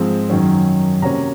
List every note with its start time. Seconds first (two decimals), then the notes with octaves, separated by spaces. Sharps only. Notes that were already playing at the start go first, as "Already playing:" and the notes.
Already playing: G#2 F3 G#3 C4
0.30 F#2 D#3 F#3 C#4
1.02 C3 F#3 A#3 C#4 A#5